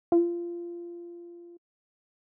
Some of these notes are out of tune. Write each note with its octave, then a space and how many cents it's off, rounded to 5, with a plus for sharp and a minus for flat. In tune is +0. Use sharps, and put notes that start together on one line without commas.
F4 -20